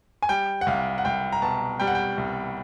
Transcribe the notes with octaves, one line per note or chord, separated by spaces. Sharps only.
G#5
G3 G5
F#5
C2 F5
F#5
C2 G5
A#5
B2 A5
G3 G5
F#5
G5
C2